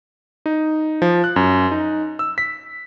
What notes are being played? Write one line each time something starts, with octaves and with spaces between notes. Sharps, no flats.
D#4
F3
F#6
F#2
D#4
E6
B6